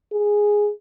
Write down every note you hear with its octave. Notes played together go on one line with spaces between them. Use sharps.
G#4